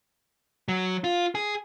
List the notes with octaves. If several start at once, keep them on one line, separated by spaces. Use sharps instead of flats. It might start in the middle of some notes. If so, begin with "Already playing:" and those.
F#3
F4
G#4